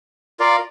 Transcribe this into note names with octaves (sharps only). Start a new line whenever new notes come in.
F4 A#4 D5 F5